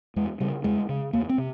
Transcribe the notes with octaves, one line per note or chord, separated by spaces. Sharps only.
E2 G#3
C#3 G3
E2 G#3
C#3
E2 A#3
C4
C3